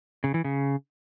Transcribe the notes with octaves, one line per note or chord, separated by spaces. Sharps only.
C#3
E3
C#3